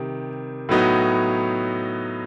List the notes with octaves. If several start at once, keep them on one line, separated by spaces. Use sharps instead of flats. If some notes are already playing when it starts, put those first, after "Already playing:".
Already playing: C3 D#3 G3
A2 F#3 B3 D#4 F#4